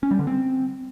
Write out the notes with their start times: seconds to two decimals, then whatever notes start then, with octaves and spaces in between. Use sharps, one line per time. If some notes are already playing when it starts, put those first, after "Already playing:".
0.03 C#4
0.11 G3
0.19 D3
0.27 C4